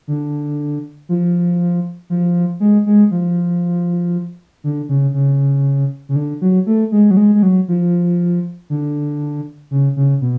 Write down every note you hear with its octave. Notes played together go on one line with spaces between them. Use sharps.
D3
F3
F3
G#3
G#3
F3
D3
C#3
C#3
C#3
D3
F#3
A3
G#3
F#3
G#3
G#3
F#3
F3
D3
C#3
C#3
B2